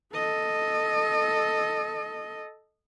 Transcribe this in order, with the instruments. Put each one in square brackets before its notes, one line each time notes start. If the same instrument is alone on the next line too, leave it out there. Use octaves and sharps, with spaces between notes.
[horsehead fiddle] A4 D#5